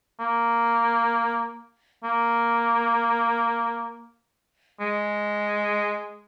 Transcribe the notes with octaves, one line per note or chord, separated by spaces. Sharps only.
A#3
A#3
G#3